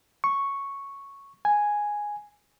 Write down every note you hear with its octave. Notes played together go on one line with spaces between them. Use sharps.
C#6
G#5